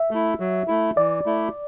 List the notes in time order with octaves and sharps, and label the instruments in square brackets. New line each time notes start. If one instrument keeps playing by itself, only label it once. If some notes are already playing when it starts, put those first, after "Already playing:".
Already playing: [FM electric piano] E5
[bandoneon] A3 E4
F#3
A3 E4
[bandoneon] E3 [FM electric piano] D5
[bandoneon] A3 E4